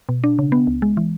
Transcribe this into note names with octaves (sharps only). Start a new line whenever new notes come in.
B2
D4
C#3
B3
C#2
G#3
E3